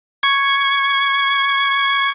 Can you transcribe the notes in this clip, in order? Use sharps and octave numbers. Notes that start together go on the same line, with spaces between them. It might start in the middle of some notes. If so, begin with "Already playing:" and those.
C#6 G#6